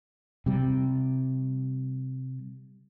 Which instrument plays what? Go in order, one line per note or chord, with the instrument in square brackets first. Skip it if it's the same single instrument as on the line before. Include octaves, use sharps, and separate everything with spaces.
[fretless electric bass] C3 G3